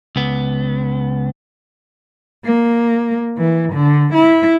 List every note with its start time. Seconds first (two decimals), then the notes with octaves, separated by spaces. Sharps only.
0.16 C#2 B3
2.44 A#3
3.38 E3
3.71 D3
4.13 E4